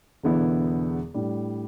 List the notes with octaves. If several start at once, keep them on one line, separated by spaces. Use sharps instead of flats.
E1 E2 D3 B3 E4
A2 G3 D4